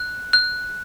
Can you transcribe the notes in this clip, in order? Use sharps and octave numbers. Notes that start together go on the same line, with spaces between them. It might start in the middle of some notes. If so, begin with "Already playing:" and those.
Already playing: F#6
F#6